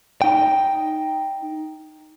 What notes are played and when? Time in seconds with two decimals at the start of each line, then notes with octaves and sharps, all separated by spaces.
0.22 D#4 G5